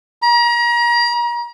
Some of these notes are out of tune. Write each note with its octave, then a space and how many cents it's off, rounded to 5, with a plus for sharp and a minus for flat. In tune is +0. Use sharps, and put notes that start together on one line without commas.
A#5 +35